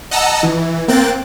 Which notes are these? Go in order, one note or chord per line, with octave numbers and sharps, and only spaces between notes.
D#5 F#5 A5 A#5 E6
E3
A#3 C4 G5 F#6 A6